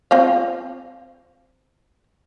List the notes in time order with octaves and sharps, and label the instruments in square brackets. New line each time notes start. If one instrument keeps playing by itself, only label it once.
[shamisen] C4 F4 F5